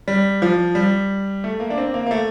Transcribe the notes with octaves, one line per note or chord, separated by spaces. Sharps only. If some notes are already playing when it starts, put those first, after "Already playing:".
G3
F3
G3
A3
A#3
D4
C4
A#3
A#3
A3